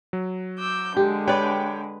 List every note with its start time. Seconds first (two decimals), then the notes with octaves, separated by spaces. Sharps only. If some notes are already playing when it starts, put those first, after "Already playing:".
0.13 F#3
0.58 D6 E6 G6
0.97 D3 G#3 G4
1.28 B4 C#5 D5 G5